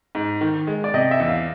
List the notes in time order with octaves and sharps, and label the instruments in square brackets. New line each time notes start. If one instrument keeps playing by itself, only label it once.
[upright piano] G#2
D#3
G#3
[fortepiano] D5
[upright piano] C3 [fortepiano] D#5
[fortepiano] E5
[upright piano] E2
[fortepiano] F5